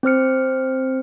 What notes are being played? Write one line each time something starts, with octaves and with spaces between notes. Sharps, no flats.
C4 C5 F6 C#7